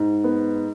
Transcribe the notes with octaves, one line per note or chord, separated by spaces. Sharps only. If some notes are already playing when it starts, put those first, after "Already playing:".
Already playing: G#2
B3